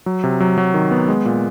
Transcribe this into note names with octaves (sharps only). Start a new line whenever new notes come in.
F#3
C3
F#3
F#3
D#3
B3
G#3
A#2